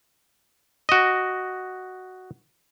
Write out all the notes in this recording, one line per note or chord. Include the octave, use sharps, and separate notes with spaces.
F#4 D#5